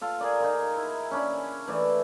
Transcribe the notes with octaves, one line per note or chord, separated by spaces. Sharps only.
F4 A4 F5
G#4 A#4 D5
D#4 F4 A#4
E4
C#4 D4 B5
E3 A3 E4 D5